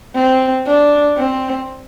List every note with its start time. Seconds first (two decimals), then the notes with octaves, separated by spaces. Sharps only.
0.15 C4
0.66 D4
1.17 C4